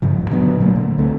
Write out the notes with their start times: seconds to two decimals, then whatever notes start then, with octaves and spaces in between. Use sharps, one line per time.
0.02 G2 C#3 F3
0.18 D1
0.31 A#2 D3 F#3 B3
0.60 A#2 F#3 A3 A#3
0.76 D3
0.98 C#2 A3 C4